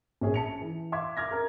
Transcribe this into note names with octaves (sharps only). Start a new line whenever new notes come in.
A#1 C#4 G#4
A5 C#7 F7
E3
E5 F5 C6 D6 G#6
D6 F6 G#6 A#6
A#4 A#5 F6